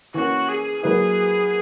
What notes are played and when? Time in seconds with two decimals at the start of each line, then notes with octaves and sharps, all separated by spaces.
0.14 E3 A#3 C#4 F#4
0.49 G#4
0.83 F#3 A#3 E4 G#4 B4